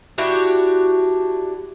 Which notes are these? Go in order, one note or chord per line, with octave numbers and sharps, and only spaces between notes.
D4 E4 F#4 G4